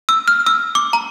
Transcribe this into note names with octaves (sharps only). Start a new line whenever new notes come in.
E6
F6
E6
D6
A#5